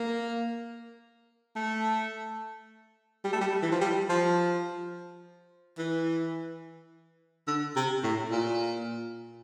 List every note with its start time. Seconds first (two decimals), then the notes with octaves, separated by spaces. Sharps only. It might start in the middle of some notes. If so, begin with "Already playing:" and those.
Already playing: A#3
1.56 A3
3.25 G3
3.33 A3
3.41 G3
3.63 E3
3.72 F3
3.81 G3
4.09 F3
5.78 E3
7.48 D3
7.76 C3
8.04 A2
8.32 A#2